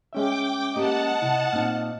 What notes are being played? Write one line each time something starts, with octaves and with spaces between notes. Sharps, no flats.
G#3 C#4 E5 G5 D6
A#3 G4 D#5 F#5 A5
C3 E4
A#2 C4 D#4 F6